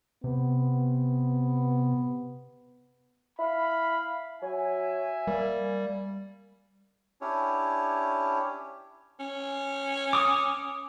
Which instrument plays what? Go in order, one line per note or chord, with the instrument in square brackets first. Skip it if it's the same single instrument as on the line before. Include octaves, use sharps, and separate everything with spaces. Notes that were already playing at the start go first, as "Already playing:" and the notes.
[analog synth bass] C3 [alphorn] B3
[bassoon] E4 [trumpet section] F5 B5
[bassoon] F#3 [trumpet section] E5 G#5
[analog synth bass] G3 [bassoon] A#3
[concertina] C#4 D4 E4 G4 C#5
[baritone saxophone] C#4
[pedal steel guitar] D6 D#6